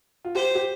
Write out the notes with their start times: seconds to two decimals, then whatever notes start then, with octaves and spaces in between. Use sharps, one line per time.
0.25 F4
0.35 G4 C5
0.55 G4